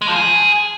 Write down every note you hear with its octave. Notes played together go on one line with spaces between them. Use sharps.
G#3
F3
G#4